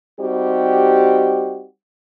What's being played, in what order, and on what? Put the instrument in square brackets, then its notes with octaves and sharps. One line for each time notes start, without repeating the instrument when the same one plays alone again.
[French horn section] G3 C4 D#4 F#4 G4